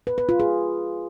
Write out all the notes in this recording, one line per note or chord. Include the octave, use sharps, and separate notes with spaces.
B4
B4
F4
G#4